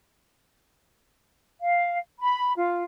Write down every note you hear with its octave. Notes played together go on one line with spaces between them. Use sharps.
F5
B5
F4